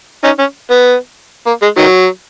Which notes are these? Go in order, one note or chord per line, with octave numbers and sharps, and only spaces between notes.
C#4 D#4
C#4
B3
A#3
G#3
D#3 F#3